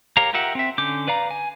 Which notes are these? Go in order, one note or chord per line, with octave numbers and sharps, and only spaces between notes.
G4 A#4 C#5 F5 A#5
F4 G4 A#4 E5 F#5
C4 E5
D3 C#4 D6 G6
B4 D5 F5 A#5
G#5